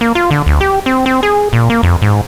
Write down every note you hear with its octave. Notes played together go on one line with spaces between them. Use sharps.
A#3
F4
D3
D2
G4
C4
C4
G#4
A#2
A#3
F2
G#2